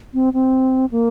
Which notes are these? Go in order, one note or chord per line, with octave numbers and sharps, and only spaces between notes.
C4
C4
A#3